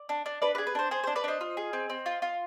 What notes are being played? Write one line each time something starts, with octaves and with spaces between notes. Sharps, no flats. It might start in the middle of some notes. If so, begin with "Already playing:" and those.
Already playing: D5
D4
D4
D4 B4 D5
G#4 B4 D5
B4
D4 C5
G#4 C5
D4 C5
B4 D5
D4 C5 D#5
F4
G#4
C4
C4
F4
F4